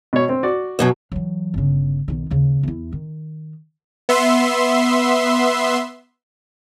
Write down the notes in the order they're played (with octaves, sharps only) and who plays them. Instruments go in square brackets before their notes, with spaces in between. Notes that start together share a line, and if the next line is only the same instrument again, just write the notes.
[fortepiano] B2 C#5
C4
F#4 D5
[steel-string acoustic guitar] F#2 B2 F#3
[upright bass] E3 F#3
G1 C#3
B1 D#3
D#2 C#3
E2 E4
D#3
[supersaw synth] B3 E5 C6